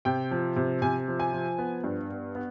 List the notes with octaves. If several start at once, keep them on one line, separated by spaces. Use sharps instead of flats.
C3 G5
F3
C3
C3 G#5
F3
G#5
F3
B3
G2
B3
B3